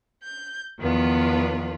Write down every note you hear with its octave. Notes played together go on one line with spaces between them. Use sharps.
G6
E2 D#3 F3 B3 F4 B4